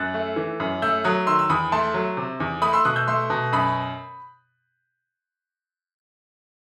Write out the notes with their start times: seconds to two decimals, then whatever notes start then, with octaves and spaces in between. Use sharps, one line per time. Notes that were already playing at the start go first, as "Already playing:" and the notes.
Already playing: F#2 F#6 A6
0.14 A3
0.36 E3
0.60 F#2
0.82 A3 E6 G6
1.04 F#3 D#6 F#6
1.27 D#3 C6 E6
1.39 E6
1.50 E2 B5 D#6
1.72 A3 A5 C6
1.94 F#3
2.17 C3
2.40 E2
2.62 A3 B5 D#6
2.73 C6 E6
2.85 B2 D#6 F#6
2.96 E6 G6
3.08 A3 C6 E6
3.30 B2
3.52 F#2 B5 D#6